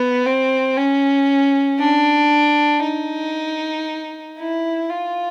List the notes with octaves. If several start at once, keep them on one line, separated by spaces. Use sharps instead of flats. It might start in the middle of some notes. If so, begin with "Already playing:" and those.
Already playing: B3
C4
C#4
D4
D#4
E4
F4